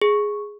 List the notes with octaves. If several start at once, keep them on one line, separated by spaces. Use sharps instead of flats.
G#4